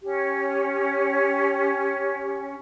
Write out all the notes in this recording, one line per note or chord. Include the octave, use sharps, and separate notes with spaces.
C#4 G4